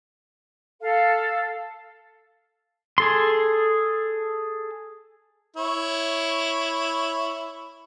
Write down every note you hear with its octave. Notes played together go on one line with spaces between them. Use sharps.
A4 F5
G#4 A4 C6
E4 C#5